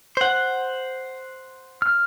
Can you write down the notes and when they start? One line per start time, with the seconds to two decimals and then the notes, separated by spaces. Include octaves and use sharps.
0.17 C5 F#5
1.82 F6